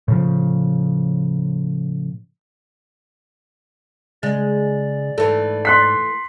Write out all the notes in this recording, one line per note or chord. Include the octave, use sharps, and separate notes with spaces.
A2 C#3 F3
C#3 G#3 D5
G#2 E3 A3
C6 F#6 B6